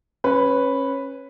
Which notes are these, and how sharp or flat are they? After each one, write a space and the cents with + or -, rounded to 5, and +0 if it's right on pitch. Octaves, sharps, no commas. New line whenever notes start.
C#4 -20 B4 +0